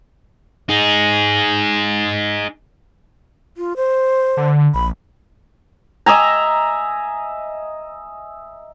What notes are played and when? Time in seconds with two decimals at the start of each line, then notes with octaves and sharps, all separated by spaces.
0.69 D#4 G#4
3.57 F4
3.77 C5
4.37 D3
4.74 A#1 B5
6.06 D#5 E5 G#5 A#5